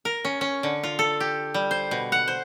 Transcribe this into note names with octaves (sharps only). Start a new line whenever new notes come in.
A#4
C#4
C#4
D3
F4
A4
G4
G3
C5
B2
F#5
C5